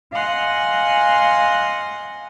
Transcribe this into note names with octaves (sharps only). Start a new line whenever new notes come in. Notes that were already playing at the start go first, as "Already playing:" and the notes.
D#5 F5 F#5 G#5 C6